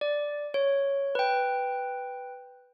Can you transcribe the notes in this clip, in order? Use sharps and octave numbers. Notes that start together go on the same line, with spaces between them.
D5
C#5
B4 G5